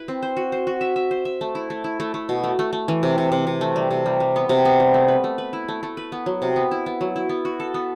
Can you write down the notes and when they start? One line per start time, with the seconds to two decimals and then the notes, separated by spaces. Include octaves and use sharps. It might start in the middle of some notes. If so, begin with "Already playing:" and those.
Already playing: E4 B4
0.08 C4
0.23 C5
0.37 F#4
0.52 C5
0.67 F#4
0.81 E5
0.96 E5
1.11 C5
1.25 E5
1.41 A3
1.55 E4
1.70 A3
1.84 E4
2.00 A3
2.14 A3
2.29 B2
2.44 A3
2.59 A3
2.73 A3
2.88 E3
3.03 C3
3.18 C3
3.32 C3
3.47 C3
3.61 A3
3.76 G3
3.91 C3
4.06 G3
4.20 G3
4.36 B3
4.49 C3
4.65 B3
4.80 G3
4.94 A3
5.08 B4
5.24 A3
5.38 B4
5.53 E4
5.68 A3
5.83 A3
5.97 B4
6.12 B3
6.26 F#3
6.42 C3
6.56 B3
6.71 E4
6.86 B3
7.01 F#3
7.16 E4
7.29 B3
7.45 F#4
7.60 A4
7.74 B3